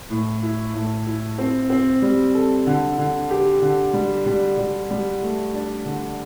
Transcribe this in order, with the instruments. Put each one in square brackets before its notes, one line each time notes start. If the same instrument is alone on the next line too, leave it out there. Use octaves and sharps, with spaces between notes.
[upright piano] A2
E4
A2
E4
C4
C4
G3
A4
D3
D3
G4
D3
G3
G3
G3
G3
A3
D4
D3